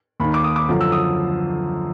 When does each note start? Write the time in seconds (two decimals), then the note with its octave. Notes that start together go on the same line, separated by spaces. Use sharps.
0.20 D#2 D#3 B5
0.34 D6
0.44 D#6
0.56 D6
0.69 F#2 D3 F3
0.81 E6
0.92 D#6